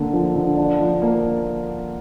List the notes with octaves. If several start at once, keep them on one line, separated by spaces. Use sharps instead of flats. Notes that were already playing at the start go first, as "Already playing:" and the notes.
Already playing: D3 A#3
F3
D3
D4
F3
A#3